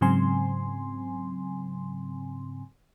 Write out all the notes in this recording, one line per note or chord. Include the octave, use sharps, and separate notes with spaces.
G#2 C#3 F#3 C4 G#5 C6